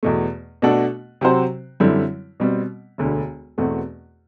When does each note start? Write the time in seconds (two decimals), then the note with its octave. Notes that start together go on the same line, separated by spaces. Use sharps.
0.03 E2 B2 A3
0.62 B2 A3 D4 F#4 A4
1.21 C3 F#3 C4 F#4 C5
1.80 F#2 D3 G3 C4 E4
2.40 B2 G3 C4
2.98 E1 D2 D3
3.58 E2 B2 A3 C4 F#4